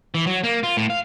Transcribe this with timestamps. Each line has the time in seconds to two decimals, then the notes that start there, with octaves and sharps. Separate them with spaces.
0.15 E3
0.27 F#3
0.44 A#3
0.63 F4
0.77 A2
0.90 F5